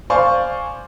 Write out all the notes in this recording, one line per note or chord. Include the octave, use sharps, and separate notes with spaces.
C5 D5 F5 G#5 C6 C#6